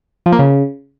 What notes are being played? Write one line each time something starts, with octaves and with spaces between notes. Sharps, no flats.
F3
A#3
C#3